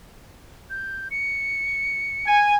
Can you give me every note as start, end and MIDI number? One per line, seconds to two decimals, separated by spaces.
0.70 1.09 91
1.11 2.37 97
2.27 2.56 80